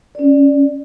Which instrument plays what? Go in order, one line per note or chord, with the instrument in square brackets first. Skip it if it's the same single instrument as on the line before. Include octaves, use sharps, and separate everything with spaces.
[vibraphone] C#4 D5